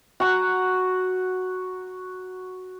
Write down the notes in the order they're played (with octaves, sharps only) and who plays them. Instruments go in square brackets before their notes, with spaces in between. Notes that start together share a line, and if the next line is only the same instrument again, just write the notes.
[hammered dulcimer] F#4 F#5 A#5